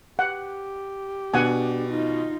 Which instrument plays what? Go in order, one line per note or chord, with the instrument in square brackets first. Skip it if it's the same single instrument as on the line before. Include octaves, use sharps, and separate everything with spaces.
[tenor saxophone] G4 [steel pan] F#5
[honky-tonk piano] B2 [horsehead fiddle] D4 [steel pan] F#5 G#5
[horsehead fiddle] D#4 F4